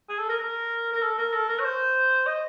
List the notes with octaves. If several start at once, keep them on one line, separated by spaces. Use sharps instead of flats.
G#4
A4
A#4
A#4
A#4
A4
A#4
A4
A#4
C#5
C5
D#5